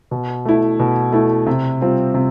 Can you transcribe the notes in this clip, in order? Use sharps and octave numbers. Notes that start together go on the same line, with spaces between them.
B2
A3 E4
B2
A3 E4
C3
G3 C4 F4
C3